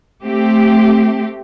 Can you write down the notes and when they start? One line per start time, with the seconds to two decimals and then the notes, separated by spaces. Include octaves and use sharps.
0.22 A3 C4 G4